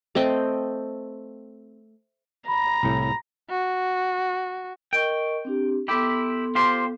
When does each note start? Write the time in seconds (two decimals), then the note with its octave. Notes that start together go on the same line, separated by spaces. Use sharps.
0.15 A3 C4 D#5 G5
2.48 A#5 B5
2.83 C2 A2
3.50 F#4
4.93 A#4 D#5 G5 C#6
5.45 C4 D4 G4
5.88 B3 E4 G4 A4 C6
6.55 F4 G4 C5